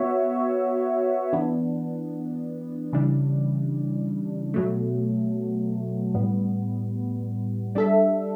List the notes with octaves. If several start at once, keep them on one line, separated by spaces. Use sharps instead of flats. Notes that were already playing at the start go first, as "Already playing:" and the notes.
Already playing: B3 F#4 C#5 E5
E3 B3 D4
C#3 E3 G3 D4
B2 F#3 A3
A2 G3 B3
G3 D4 A4 E5